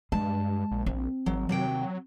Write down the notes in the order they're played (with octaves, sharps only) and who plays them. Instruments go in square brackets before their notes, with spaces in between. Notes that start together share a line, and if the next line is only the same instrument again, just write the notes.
[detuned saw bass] G2 [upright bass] G#3 [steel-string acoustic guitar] A5
[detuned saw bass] A#1
[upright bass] C4
[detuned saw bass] G#1 [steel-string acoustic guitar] F#3
[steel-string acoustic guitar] D#2 C3 G5 [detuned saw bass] F#3